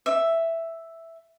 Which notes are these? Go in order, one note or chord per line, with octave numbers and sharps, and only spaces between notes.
E5